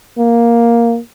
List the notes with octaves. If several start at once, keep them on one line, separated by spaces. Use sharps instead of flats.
A#3